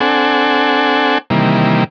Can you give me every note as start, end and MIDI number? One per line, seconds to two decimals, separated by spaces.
0.01 1.18 60
0.01 1.18 62
0.01 1.18 69
0.01 1.18 78
0.01 1.18 80
1.30 1.84 48
1.30 1.84 51
1.30 1.84 52
1.30 1.84 55
1.30 1.84 58